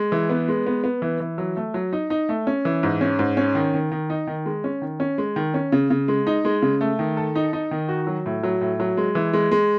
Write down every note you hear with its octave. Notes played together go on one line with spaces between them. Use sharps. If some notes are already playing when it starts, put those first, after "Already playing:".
Already playing: G#3
E3
B3
G#3
B3
B3
E3
E3
F#3
A3
F#3
D#4
D#4
A3
C#4
E3
G#2
C#4
G#2
C#4
D#3
D#3
D#3
D#4
D#3
G#3
C#4
D#3
C#4
G#3
D#3
C#4
C#3
C#3
G#3
D#4
G#3
C#3
A3
D#3
A4
D#4
D#4
D#3
F#4
F#3
A2
F#3
A2
F#3
G#3
E3
G#3
G#3